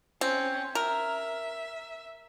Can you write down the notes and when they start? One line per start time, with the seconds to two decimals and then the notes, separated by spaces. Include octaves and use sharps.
0.21 C4 C#4
0.75 A#4 E5